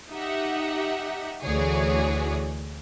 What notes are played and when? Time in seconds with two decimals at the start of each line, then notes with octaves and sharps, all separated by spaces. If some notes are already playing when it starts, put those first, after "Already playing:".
0.11 D#4 G4 E5 F#5
1.42 D2 E3 F#4 G#4 C#5 D5